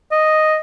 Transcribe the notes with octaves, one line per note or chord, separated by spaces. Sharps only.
D#5